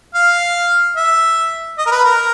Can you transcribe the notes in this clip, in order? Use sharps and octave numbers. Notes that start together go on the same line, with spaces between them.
F5
E5
D#5
A#4
B4
A#4